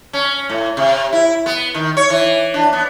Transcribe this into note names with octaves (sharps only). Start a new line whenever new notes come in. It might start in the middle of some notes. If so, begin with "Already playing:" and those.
C#4
A2
C3
E4
B3
D#3
C#5
E3
D4
B3